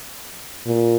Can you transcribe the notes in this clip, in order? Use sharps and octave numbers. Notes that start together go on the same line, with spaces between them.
A#2